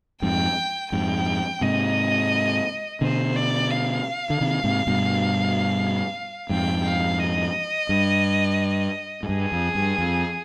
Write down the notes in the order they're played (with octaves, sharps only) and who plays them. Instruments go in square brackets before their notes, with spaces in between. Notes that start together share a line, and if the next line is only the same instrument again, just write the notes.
[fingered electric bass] F2 G#2 [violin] G5
[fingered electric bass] F2 G#2 [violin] G5
[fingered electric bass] G#2 C3 [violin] D#5
[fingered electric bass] B2 D3 [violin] C5
[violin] D5
F5
[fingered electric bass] D3
C3 D#3
G#2 C3
G2 B2
[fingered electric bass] F2 G#2 [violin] G5
[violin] F5
D#5
[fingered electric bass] G2
G#2
[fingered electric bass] G2 [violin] G#4
[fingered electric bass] F2
G2
F2